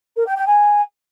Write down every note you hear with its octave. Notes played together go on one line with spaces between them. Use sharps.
A#4
G5
G5
G#5